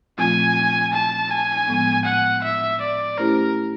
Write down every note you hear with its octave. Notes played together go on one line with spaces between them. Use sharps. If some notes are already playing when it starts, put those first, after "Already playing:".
A#2 F3 A3 C4 F4 G#5
A5
G#5
A2 F3 G#3 B3
F#5
E5
D5
A3 C#4 E4 G4 A#4 C5